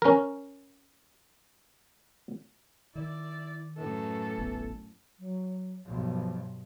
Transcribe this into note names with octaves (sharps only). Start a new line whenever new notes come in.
C#4 A#4
D#3 E4 D5
F#2 A2 E3 A4
D#1 A1 B3
F#3
B1 G2 F3